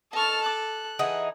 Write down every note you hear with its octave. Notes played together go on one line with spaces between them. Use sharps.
A4 D#5 A5 C#6 F6
D6 F#6
E3 D#4 G#4 F#5